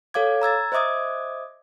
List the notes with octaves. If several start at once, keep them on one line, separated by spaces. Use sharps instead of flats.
A4 C#5 F5 D6 G#6
A#5 E6 G#6 A6
C5 D#5 E5 D6 D#6 G#6